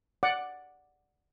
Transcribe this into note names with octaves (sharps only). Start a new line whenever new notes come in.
D5 F#5 D6